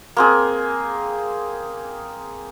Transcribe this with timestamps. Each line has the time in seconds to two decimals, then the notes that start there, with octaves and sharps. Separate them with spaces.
0.17 A#3 C4 G#4